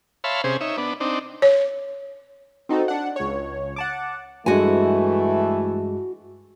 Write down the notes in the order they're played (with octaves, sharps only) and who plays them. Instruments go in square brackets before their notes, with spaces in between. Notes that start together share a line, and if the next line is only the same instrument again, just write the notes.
[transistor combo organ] C#5 E5 F5 A5 B5 C6
C3 C#4 G#4 C5
D#4 C#5 E5
B3 D4
C4 D4 D#4
[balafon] C#5
[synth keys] C4 D#4 F#4 A4
D4 F#5
C#2 C#5
F#5 A5 D6
[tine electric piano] G2 G#3 [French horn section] E3 A3 [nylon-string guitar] F#4 G#5